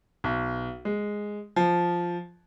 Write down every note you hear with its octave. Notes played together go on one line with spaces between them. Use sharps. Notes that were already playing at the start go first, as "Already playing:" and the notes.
B1
G#3
F3